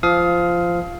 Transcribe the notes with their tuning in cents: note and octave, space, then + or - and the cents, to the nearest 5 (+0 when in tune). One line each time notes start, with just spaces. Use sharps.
F3 -15 F5 +0 D#6 +25